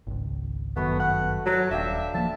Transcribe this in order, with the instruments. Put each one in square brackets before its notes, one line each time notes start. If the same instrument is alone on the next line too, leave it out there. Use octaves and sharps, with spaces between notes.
[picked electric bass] G#1 C#2
[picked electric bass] G1 F#2 D#3 [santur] A3 F#4 B4 [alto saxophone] B3
[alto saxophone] F#5
F#3
[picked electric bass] D#1 [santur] D4 F5 G5 [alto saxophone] E5
[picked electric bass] F3 A#3 [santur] E5 [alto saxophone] A5